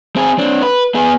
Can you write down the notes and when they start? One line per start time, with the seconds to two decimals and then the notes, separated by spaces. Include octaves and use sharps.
0.16 C4 G#4
0.38 C4 D4
0.62 B4
0.95 B3 G#4